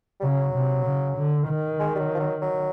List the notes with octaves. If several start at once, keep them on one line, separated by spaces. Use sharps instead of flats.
G3
C#3 F#3
C3
C#3
D3
D#3
G#3
G3
F#3
F3
F#3
F#3